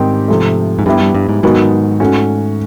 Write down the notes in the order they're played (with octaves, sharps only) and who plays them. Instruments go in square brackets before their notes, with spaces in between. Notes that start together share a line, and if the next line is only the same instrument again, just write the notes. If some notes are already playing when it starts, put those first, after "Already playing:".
Already playing: [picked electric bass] G#2 [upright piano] D#3 G3 C4 D#4 G4
[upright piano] C3 F3 A3
[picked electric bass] G#2
[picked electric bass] G2 [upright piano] G3 B3 E4 G4
[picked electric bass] G2
G2
G#2
[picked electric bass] G#2 [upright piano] D#3 F#3 B3 D#4 F#4
[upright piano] A3 C#4 F#4